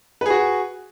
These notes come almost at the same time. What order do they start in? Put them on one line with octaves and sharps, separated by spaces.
B4 G#4 F#4